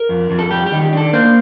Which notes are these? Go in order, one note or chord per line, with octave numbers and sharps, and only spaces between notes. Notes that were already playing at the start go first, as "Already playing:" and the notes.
Already playing: A#4
F2
F2
A4
G3 G4
G4
D#3
G4
D4 A4
A#3 C5